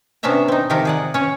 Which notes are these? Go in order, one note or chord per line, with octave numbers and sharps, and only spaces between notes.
C3 B3 C#4 D4 E5 A#5
C4 D#4
C3 D#3 F3 G4 A#4
G#4 D5 F#5
C#4 C#5